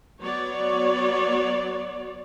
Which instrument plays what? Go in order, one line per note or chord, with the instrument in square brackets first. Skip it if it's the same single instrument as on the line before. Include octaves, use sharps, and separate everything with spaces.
[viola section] F#3 B3 C#5 D5